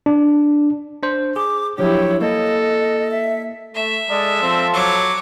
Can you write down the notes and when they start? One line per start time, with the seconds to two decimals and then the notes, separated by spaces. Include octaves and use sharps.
0.06 D4
1.03 D4 C5
1.36 G#4 D6
1.78 F3 F#3 D4 E4 G4 C#5
2.21 A#3 A4 D#5
3.11 E5
3.74 A3 E5
4.10 G#3 A4 D5
4.42 F3 C4
4.74 F#3 C#5 D6